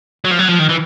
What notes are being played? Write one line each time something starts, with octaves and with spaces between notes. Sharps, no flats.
F#3
F3
F#3
F3
D#3
E3